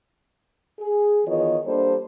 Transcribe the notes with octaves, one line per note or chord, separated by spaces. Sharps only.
G#4
D#3 E3 B3 F4 C#5 D#5
G3 A#3 D4 A4 C5